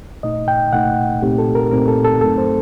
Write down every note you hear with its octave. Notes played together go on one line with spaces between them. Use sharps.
C2 A#2 A3 D#4 D#5
G5
C2 A#2 A3 D#4 F#5
C2 A#2 A3 C4 D#4 G4
A4
A#4
C2 A#2 A3 C4 D#4 A#4
A4
A4
G2 F#3 A3 C4 D#4 A4
C5